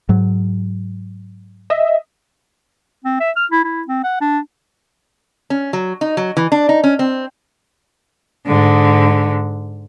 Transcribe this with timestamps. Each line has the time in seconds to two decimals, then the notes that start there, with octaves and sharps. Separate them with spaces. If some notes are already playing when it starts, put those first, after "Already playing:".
0.09 G#2 F#3
1.70 D#5 E5
3.05 C4
3.20 E5
3.36 F6
3.51 E4
3.64 E4
3.87 C4
4.04 F#5
4.21 D4
5.50 C#4
5.73 F#3
6.01 D#4
6.17 F#3
6.37 E3
6.52 D4
6.69 D#4
6.84 C#4
6.99 C4
8.47 G#2 D3